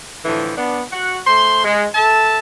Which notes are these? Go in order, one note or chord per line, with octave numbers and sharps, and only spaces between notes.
A2 D3 E3 F3
B3 D4
F#4 F#5
A3 C5 C6
G#3
A4 E5 A5